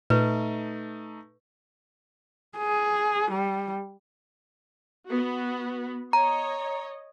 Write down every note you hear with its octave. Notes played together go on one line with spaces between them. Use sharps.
A#2 A3 D#4 B4
G#4
G3
B3 F#4
C#5 D#5 A#5